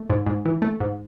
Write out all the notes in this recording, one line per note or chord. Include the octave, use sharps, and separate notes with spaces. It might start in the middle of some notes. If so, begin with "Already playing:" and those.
Already playing: A3
G#2
G#2
E3
A3
G#2